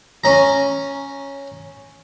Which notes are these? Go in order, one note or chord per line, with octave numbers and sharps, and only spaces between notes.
C#4 A#5